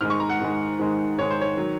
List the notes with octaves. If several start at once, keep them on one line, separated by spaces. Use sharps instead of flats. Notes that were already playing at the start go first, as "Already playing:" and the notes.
G#2 D#3 G#3 F6
C#6
A#5
F#5
G#2 D#3 G#3
G#2 D#3 G#3
G#2 D#3 G#3 C#5
C5
C#5
D#3 F#3